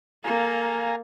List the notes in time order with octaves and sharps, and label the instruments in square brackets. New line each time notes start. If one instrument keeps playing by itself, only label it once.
[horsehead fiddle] A#3 A4 [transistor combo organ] F5 G#5 A#5